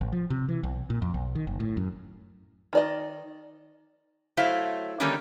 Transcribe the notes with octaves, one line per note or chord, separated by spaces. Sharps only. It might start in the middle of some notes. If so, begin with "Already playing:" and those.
A1
F3
C3
E3
B1
A#2
F2
B1
D#3
F#1
A2
F#2
D#3 D5 D#5
F#3 A3 E4 C5 E5 F5
D3 D#3 G3 A#3 C#4 D#4